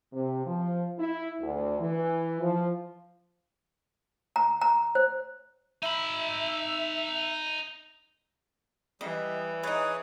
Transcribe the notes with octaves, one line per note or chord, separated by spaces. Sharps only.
C3
F3
E4
D2
E3
F3
A#5
A#5
C5
D#4 E5 B5
E3 G3 D#5
D#4 G#4 B4 C#5 D#6